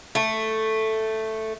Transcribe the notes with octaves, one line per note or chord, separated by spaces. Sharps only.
A3